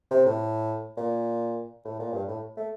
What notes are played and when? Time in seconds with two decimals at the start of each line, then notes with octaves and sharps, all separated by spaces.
0.11 C3
0.26 A2
0.97 A#2
1.85 A2
1.99 A#2
2.13 G2
2.28 A2
2.57 A3